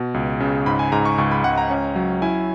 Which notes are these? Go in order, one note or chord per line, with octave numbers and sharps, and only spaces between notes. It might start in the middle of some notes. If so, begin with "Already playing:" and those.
Already playing: B2
C#2
C#3
G#2 B5
G#5
G#2 A#5
C#6
C#2 C#6
B5
C#2 F#5
A#5
C#4
F#3
E4 G#5